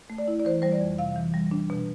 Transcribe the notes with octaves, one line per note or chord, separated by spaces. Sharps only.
A3
D5
E4
D5
E3 C5
G3 C5
D5
F2
C3 F5
E3
G3
D4
B2